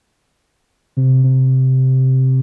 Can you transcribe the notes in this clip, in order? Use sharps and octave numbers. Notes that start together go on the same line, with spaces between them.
C3
C3